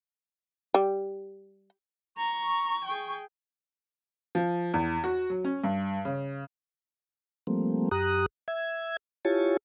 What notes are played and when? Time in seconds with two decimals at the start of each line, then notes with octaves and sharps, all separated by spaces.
0.74 G3
2.17 A#5 C#6
2.85 G#4 G5
4.35 F3
4.74 E2
5.04 F#4
5.30 F#3
5.45 C#4
5.64 G2
6.05 C#3
7.47 F3 G3 A3 A#3 C4
7.91 F#2 G4 A#5 D#6 F#6
8.48 E5 G#6
9.25 E4 F4 G4 C#5 G#5 A5